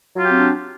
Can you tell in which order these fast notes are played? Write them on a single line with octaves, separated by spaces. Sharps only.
F#3 F4 G4 C4 D4